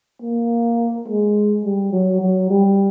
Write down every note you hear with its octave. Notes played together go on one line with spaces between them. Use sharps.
A#3
G#3
G3
F#3
F#3
G3